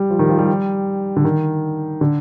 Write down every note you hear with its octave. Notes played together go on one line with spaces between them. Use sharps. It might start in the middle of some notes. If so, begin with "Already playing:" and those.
Already playing: G3
F3
D#3
F3
G3
D3
D#3
D3